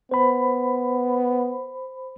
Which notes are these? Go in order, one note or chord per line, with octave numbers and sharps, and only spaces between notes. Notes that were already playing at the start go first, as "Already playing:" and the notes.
B3 C5 B5